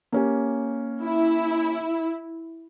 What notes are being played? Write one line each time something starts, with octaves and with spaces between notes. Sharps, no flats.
A#3 C#4 G4
E4